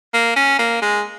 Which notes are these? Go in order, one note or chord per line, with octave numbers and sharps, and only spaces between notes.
A#3
C#4
A#3
G#3